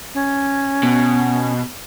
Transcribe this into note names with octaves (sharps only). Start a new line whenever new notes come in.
C#4
B2